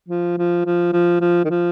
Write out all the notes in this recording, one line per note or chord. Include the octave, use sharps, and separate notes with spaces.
F3
F3
F3
F3
F3
D#3
F3